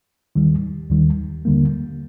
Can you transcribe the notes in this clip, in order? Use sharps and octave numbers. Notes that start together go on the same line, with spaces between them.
D#2 D#3 G3
D#2 D#3 G3
D#2 D3 G3 A#3